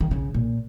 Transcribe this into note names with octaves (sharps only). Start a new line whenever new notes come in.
D#3
C#3
A#2